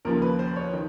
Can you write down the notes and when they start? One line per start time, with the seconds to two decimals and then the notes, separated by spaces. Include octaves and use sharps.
0.05 D#2 C#3 F3 A#3 A#4
0.22 B4
0.39 C5
0.56 C#5
0.73 D#3